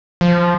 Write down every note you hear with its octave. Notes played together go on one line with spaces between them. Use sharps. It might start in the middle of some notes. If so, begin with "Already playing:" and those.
F3